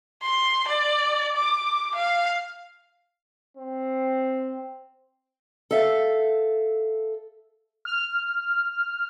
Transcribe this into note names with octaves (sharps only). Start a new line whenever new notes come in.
C6
D5
D6
F5
C4
A4 E5 F5
F6